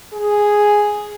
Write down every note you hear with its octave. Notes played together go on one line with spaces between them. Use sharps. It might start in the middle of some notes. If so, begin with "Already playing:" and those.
G#4